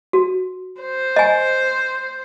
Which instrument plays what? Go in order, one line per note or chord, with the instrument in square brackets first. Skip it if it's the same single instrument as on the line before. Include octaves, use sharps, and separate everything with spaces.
[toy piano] F#4
[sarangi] C5
[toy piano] D#5 G#5